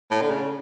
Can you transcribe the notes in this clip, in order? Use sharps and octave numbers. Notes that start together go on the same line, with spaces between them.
A2
D3
C#3